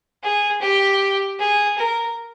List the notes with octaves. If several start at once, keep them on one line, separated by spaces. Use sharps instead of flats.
G#4
G4
G#4
A#4